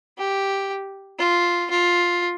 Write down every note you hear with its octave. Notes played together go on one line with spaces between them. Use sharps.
G4
F4
F4